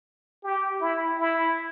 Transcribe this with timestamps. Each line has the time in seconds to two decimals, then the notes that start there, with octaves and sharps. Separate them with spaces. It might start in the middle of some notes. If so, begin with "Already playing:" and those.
0.43 G4
0.81 E4
1.19 E4